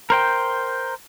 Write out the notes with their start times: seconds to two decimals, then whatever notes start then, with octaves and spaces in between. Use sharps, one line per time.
0.10 A#4 C5 G5